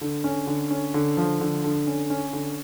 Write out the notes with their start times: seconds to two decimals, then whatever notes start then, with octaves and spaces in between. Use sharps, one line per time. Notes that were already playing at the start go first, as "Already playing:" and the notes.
0.01 D3
0.24 C#4
0.47 D3
0.70 C#4
0.94 D3
1.17 F3
1.41 D3
1.64 D3
1.87 C#4
2.10 C#4
2.33 D3